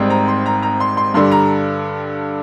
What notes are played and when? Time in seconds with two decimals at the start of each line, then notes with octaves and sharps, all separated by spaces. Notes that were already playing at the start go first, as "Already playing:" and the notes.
Already playing: G#1 G#2 G3 C4
0.10 A#5
0.28 C6
0.46 A#5
0.63 A#5
0.80 C6
0.97 C6
1.14 G2 D3 G3 C6
1.31 A#5